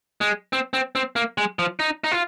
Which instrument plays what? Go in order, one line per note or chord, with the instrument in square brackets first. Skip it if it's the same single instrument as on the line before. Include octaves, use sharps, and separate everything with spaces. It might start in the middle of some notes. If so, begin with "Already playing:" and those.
[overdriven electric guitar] G#3
C4
C4
C4
A#3
G#3
F3
D#4
D#4
F4